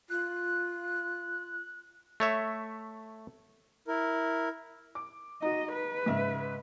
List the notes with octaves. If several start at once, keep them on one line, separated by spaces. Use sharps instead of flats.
F4 F#6
A3 C#5 E5
E4 A#4
D6
D#4 F#4 D#5
B4
G#2 C#3 E5